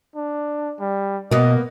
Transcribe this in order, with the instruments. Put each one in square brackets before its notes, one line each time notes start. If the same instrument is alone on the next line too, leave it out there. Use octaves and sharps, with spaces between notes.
[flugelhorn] D4
G3
[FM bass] B2 [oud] A#3 B3 [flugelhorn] D#5